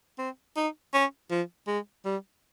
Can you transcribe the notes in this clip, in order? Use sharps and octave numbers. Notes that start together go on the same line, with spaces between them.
C4
D#4
C#4
F3
G#3
G3